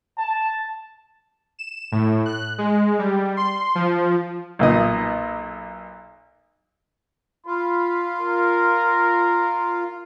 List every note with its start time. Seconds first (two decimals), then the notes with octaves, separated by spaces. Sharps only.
0.17 A5
1.59 E7
1.92 A2
2.26 F#6
2.58 G#3
2.99 G3
3.37 C6
3.75 F3
4.59 B1 A#2 D#5
7.46 F4 B5
8.21 A#4